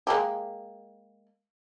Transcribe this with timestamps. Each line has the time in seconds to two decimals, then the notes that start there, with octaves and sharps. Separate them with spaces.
0.07 G#3 A#3 G4